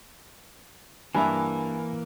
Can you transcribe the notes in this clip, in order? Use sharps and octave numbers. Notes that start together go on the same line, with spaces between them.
G2 E3 A#3 E5 G#5 B5